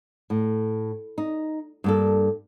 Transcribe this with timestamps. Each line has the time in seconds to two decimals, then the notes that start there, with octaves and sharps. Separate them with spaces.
0.30 A2
1.18 D#4
1.84 G2 A#3 A4